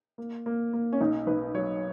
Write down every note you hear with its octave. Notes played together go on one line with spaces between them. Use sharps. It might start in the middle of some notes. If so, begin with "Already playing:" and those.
A#3
A#3
A#3
C#4
B1 D#4
B1 B4
F#3 C#5